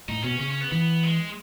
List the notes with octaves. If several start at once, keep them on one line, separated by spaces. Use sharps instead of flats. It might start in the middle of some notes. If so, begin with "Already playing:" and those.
A2 D#4
B2 C#4
C#3 C#4
C#4
B3
E3 B3
G#3